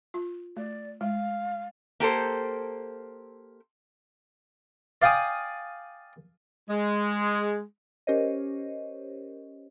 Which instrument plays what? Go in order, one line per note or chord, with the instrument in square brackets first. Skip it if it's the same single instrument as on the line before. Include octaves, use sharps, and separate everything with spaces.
[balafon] F4
[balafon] A3 [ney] D5
[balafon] G#3 [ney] F5
[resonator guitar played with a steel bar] A#3 G4 A4 C5
[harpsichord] D5 F5 G5 G#5 D#6
[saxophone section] G#3
[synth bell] C#4 G4 A#4 C5 C#5 D#5